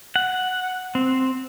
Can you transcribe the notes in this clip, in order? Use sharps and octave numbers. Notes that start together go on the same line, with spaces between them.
F#5
C4